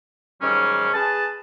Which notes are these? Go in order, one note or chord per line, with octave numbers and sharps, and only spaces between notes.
G#2 D#3 F#3 G3 C#4
G#4 B4 A5